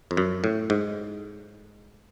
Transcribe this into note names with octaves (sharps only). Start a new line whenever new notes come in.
F2
F#2
A2
G#2